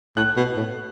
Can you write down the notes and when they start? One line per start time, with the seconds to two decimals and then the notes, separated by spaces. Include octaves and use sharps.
0.17 A2 F#6
0.37 B2
0.57 A2